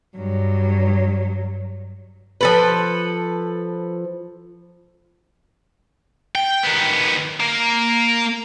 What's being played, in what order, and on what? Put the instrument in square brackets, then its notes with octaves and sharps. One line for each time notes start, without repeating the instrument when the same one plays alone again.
[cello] G2 F#3
[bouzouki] F3 A4 B4
[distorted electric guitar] G5
D#3 B3
A#3